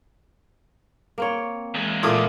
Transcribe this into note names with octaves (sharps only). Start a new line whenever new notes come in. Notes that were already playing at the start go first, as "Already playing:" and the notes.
A#3 C4 C#5
E2 G#3
A#2 A3 E4 F4 D6 D#6